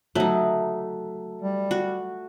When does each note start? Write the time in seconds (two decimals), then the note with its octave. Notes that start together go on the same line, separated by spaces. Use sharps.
0.15 F#3 A3 D#4
1.42 G3
1.71 F#4